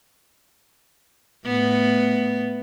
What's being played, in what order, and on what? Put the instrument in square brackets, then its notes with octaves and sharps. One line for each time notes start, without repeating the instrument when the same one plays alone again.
[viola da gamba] A2 B3